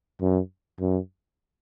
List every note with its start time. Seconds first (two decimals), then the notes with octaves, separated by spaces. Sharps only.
0.21 F#2
0.80 F#2